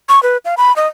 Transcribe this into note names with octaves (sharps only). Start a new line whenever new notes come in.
C#6
B4
F5
B5
D#5